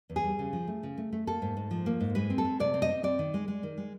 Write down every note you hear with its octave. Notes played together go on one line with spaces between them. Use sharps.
E2
G#4
G3
C#3
F3
A3
C#3
A3
A3
A#3 A4
G#2
G#2
F3
A#3
G#2
G#3 B4
C4
A4
G#3
C3 D5
C4
D#5
C4
C4 D5
D#3
G#3
G#3
D#3
G#3